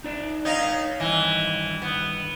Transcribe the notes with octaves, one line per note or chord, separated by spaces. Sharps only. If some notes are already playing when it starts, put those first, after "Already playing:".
D#4 D5
D#4 C#5 D#5 F5
G2 D#3 E3 D#5
B3